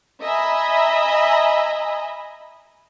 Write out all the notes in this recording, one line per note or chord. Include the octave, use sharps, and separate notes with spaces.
D#5 E5 G#5 A#5 B5